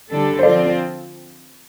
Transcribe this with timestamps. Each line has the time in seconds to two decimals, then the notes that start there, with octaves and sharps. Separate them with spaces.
0.10 D3 G3 D4 A4
0.39 C5
0.43 F3 C4 F4 A4 D5